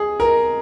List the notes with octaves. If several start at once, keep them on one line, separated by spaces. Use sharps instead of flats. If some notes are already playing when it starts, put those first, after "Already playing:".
Already playing: G#4
A#4